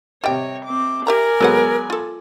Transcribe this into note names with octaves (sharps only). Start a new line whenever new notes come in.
C3 G3 C#5 D#5 G5
C4 D6
G4 A#4 D5 E5 G#5 A#5
F#3 G#3 B3 A4 B4 F#5
F4 A4